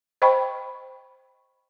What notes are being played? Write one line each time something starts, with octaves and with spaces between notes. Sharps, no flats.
C5 D#5 G5 B5 C#6